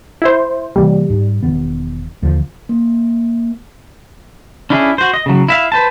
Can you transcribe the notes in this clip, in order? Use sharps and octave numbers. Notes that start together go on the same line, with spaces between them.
E4 C5
C3 E3 G3 A#3
G#2
E1 D#3 B3
D#2 D3 F3
A#3
C#4 D4 E4 G#4
F#4 C5
D#5
C#3 F#3
E4 E5 F5
B4 C5 A5